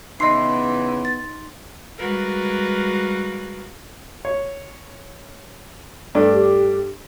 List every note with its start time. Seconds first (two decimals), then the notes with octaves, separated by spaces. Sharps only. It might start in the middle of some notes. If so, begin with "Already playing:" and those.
0.20 C#3 E3 B3 D#4 D#5 C6 C7
1.05 A6
1.98 G3 G#3 F#4 A#4 B4 F5
4.25 C#5
6.15 G2 A3 D4
6.33 G4